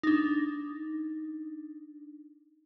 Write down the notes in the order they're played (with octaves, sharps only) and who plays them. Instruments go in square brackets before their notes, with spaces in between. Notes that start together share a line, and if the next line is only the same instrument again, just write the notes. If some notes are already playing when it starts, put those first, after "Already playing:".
[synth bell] D4 D#4